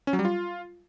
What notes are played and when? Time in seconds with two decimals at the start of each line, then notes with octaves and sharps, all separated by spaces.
0.07 C#4
0.13 F#3
0.19 G3
0.25 F4